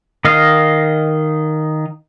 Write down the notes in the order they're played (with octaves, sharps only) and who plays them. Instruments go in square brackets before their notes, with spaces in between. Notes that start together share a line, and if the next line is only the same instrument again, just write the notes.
[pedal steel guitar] D#3 D#5 F5